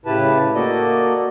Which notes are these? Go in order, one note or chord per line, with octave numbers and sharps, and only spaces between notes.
A2 C#3 E4 G4 B4 A5
A#3 F#4 A4 D5 D#5